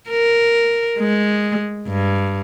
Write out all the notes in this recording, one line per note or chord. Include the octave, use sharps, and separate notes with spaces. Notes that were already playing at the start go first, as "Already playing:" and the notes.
A#4
G#3
G2